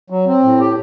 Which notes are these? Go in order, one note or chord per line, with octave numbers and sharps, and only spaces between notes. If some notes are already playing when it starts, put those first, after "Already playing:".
F#3
C4
A2
G4